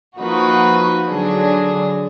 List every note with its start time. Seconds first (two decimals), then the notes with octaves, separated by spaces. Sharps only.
0.18 F3 A#3 D#4 F#4 B4
1.08 D3 F#3 D4 G#4